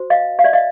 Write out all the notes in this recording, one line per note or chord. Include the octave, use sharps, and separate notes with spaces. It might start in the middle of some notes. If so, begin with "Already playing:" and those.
Already playing: F#4 C5
D#5 F5
F5
D5 E5
D#5 F5